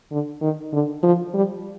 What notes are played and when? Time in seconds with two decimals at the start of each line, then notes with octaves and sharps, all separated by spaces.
0.11 D3
0.41 D#3
0.73 D3
1.03 F3
1.34 G3